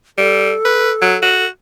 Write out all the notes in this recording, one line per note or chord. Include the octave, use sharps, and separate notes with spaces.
G3 A4
B4
F#3
F#4